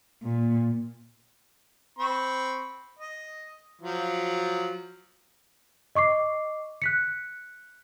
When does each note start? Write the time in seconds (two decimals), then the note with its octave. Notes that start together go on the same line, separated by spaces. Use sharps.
0.23 A#2
1.99 C4 B5 C#6
2.99 D#5
3.81 F3 F#3
5.95 D#5 C#6 D6 C7
6.82 F#6 B6 C#7